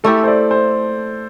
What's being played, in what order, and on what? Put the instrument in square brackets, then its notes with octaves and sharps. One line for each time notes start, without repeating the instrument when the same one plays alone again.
[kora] A3 E4 G4 [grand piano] A4
[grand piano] C5
D5
C5